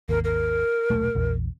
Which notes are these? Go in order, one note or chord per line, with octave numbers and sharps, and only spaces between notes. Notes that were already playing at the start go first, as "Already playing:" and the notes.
G#1 D#2 A#4
A#4
D#1 B1 A3
A#1 E2